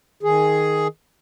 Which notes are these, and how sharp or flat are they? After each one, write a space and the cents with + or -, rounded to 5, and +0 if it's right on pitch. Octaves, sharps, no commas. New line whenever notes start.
D#3 +0 G#4 +5